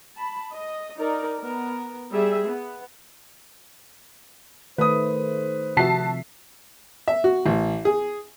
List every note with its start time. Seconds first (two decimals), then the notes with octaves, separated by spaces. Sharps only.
0.17 A5 B5
0.53 D#5
0.97 D#4 A#4 D5
1.39 B3 A#4
2.12 G3 G#4 E5
2.48 B3
4.78 D#3 A3 B4 C5 D#6
5.77 C3 F3 F#4 E5 A5 C7
7.08 E5
7.24 F#4
7.46 A1
7.85 G#4